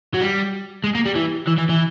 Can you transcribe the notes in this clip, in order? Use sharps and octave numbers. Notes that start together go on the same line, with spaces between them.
F#3
G3
G#3
A#3
G3
E3
E3
E3
E3